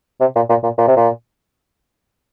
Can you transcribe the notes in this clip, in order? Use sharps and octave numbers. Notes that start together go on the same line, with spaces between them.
C3
A#2
A#2
A#2
A#2
C3
A#2